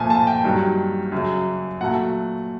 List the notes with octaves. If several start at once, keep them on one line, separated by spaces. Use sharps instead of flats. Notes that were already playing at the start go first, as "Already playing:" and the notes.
Already playing: A#2 F3 A3 G#5 A5
A5
G5
G2 D#3 F#3
F#2 C#3 F#3
A#2 F#3 A3 F#5